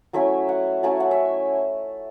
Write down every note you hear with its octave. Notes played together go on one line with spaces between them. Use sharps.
F#3 A3 C#4 E4 E5
F#5
F#3 A3 C#4 E4 A5
F#5
E5